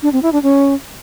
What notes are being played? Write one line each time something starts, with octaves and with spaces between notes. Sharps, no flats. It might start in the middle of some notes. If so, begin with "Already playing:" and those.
D4
C4
E4
D4
C#4